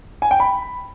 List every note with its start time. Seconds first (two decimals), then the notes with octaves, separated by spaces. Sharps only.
0.22 G#5
0.31 G5
0.40 B5